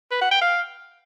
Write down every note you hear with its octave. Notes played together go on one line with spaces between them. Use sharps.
B4
F#5
G5
F5